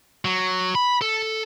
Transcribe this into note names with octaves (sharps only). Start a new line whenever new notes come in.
F#3
B5
A4